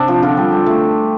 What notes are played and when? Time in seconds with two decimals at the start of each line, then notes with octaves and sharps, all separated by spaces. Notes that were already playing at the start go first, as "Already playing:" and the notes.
Already playing: C3 C4 D4
0.08 F3
0.22 D3 F4
0.37 G3
0.52 G3
0.66 A3